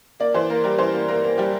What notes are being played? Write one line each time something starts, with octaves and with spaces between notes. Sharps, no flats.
A#3 D5
E3 C5
A#3 A#4
G3 A#4
E3 C5
A#3
A#3 A#4
A#3
G3 G4